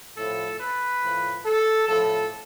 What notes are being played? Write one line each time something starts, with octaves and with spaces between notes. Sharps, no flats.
A2 F3 A4
B4
A2 F3
A4
A2 F3 A4